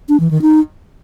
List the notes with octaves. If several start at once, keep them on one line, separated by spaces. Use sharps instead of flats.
D4
E3
D#3
D#4